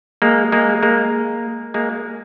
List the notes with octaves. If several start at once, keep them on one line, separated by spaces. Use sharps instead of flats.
G#3 A#3
G#3 A#3
G#3 A#3
G#3 A#3